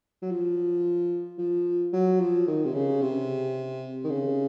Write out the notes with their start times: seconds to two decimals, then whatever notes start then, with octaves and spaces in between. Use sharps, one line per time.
0.22 F#3
0.31 F3
1.38 F3
1.93 F#3
2.20 F3
2.47 D#3
2.65 C3
2.74 C#3
3.02 C3
4.04 D#3
4.10 C#3